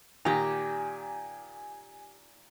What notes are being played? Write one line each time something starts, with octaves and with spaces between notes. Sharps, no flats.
A#2 D#3 G4 G#5 A#5